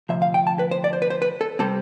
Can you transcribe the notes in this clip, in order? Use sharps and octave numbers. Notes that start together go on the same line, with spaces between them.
D2 C3 F3 E5
F5
G5
A5
B4
C5
D5
C5
B4
C5
B4
A4
C3 G3 C4 A4